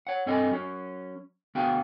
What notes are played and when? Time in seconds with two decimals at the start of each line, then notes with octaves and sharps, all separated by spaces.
0.07 C#5 F#5
0.26 G2 C4 A4 D#5 G#5
0.51 F#3 C#4
1.55 D2 B3 F#4 G#4 F5 G5